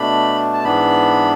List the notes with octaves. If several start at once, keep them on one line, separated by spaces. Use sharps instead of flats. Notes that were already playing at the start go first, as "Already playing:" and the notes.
Already playing: B2 A3 D4 B5
A5
G#2 E3 B3 D4 B5